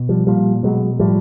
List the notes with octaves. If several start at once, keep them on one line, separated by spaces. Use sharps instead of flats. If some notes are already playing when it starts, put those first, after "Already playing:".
Already playing: B2
F3 G3
A#2 F3 G3
B2 F#3 G#3
A2 F3 G3